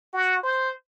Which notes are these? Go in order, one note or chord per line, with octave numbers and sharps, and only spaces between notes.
F#4
C5